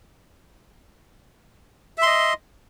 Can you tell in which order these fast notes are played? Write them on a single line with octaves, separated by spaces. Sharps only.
E5 C6 D#5